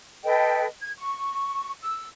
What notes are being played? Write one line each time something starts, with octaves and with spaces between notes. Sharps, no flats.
A4 B4 D#5 G5
G#6
C#6
E6